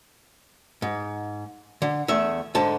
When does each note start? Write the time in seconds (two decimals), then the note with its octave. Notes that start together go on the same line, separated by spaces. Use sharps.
0.82 G#2
1.82 D3
2.08 E2 A3 E5
2.55 G#2 D3 A5